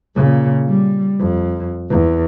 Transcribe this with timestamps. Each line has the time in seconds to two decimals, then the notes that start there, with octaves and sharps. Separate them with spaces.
0.15 A#2 C#3
0.68 G3
1.19 F2
1.90 E2